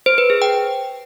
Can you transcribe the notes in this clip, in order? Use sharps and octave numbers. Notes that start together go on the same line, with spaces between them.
C5
B4
G#4
G5